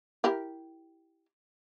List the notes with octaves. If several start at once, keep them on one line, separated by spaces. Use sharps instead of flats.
E4 G4 A#4